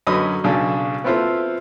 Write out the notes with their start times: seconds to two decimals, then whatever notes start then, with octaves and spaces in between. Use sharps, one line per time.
0.07 F#2 D3 C#4 B4 D#5 D#6
0.44 B1 C#3 D4 A5
1.04 B3 C4 E4 F4 A4 C5